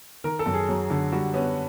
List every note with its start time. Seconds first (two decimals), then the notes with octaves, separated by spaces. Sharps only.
0.24 D#3 A#4
0.39 A4
0.46 F#2
0.54 G#4
0.69 F#3
0.90 D3
1.12 G3 F#4
1.34 B3 C#4